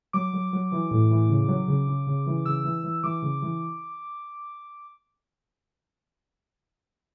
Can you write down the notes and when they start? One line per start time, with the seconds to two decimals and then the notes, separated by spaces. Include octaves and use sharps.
0.13 F#3 D6
0.33 F#3
0.53 F#3
0.72 E3
0.91 A2
1.11 E3
1.29 C#3
1.48 F#3
1.68 C#3
1.87 C#3
2.07 C#3
2.27 E3
2.46 C#3 E6
2.65 E3
2.84 E3
3.03 E3 D6
3.22 C#3
3.42 E3